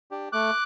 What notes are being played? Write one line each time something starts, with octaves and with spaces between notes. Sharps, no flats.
D4 G4
A3 D6 F#6